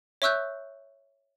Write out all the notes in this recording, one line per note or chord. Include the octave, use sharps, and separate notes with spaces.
C#5 E5 C#6 E6 F#6 G6